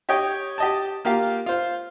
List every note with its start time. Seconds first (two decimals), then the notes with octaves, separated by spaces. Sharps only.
0.09 G4 C#5 D#5 G5
0.58 G4 D#5 A5
1.05 A#3 F4 G4 F5
1.46 F4 C5